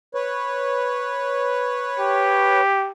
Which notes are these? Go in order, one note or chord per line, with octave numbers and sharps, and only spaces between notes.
B4 C#5
G4